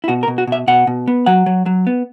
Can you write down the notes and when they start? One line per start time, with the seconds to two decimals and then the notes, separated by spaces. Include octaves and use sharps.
0.04 E4
0.08 B2 F#4
0.23 A#4
0.28 B2
0.38 F#4
0.47 B2 E5
0.68 B2 F#5
0.87 B2
1.08 B3
1.26 F#3 F#5
1.46 F#3
1.66 F#3
1.87 B3